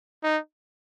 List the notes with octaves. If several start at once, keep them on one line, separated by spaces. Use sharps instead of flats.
D#4